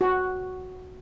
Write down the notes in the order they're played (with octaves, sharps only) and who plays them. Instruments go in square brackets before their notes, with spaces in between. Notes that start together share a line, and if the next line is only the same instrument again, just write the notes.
[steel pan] F#4